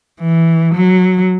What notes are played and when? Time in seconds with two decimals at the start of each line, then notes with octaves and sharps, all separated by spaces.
0.20 E3
0.74 F#3